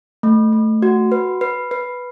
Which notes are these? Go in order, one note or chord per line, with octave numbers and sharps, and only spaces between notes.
A3
A3
F#4
B4
B4
B4